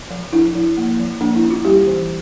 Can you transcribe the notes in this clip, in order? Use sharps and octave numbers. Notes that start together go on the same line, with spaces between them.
F3
D4 E4
F3
A#3
F3
A#3 D4
E4
C#4
F4
G3 G4
E3